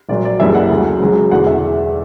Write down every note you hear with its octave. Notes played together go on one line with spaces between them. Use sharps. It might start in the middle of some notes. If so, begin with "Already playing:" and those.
A#1 A#2 F#3 D5
D5
F#1 F#2 E3 G3 E5
F#5
D2 C#3 F#3
C#2 C#3 F#3
E1 E2 D3 F#5
E5